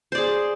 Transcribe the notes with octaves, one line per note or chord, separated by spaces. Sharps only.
G#4 C5 D5